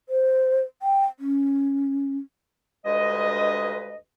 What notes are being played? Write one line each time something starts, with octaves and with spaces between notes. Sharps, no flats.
C5
G5
C#4
D2 G2 G#3 B4 D#5